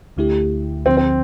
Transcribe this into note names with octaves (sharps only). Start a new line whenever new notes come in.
D2 D3 A3 E4 G4
D2 D3 F3 C4
C4